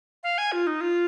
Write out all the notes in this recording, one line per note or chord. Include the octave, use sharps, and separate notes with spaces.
F5
G#5
F4
D#4
F4